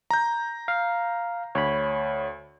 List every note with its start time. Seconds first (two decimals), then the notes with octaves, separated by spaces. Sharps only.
0.10 A#5 G6
0.68 F5
1.55 D2 C#5 B5